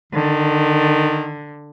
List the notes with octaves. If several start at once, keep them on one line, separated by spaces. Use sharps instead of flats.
D3 D#3